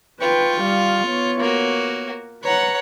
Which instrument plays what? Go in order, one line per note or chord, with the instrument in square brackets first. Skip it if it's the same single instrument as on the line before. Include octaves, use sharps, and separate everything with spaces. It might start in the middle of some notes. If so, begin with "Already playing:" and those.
[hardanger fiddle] F4 C#6 [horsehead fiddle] B4 G5
[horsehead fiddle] G3 F5
B3 C#5
[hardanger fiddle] A#3 F#4
[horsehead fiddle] B4 A#5 [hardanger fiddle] C#5 F#5